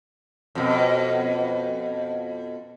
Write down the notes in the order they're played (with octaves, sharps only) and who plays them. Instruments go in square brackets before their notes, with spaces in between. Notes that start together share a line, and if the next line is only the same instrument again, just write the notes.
[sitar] F2 B2